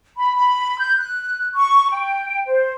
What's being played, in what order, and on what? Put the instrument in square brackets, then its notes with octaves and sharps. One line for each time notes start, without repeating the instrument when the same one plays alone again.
[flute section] B5
B5
G6
F#6
C#6
G5
C5